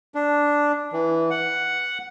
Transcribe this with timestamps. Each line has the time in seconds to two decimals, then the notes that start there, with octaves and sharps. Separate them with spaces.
0.15 D4
0.93 E3
1.30 F#5